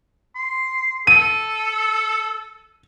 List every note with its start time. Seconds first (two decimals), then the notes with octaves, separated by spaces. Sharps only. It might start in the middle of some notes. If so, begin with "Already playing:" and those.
0.35 C6
1.07 A4 D#7